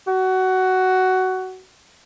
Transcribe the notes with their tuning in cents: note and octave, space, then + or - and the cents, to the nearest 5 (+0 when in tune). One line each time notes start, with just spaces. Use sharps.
F#4 +15